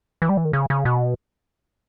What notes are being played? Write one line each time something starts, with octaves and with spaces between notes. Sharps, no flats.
E3
G3
E3
D#3
C#3
C#3
B2